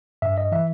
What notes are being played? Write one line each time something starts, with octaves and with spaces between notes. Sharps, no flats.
G2 E5
D#5
E3 E5